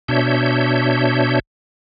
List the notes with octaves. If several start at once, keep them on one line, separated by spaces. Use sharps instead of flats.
B2 D4 C#5 E5 G6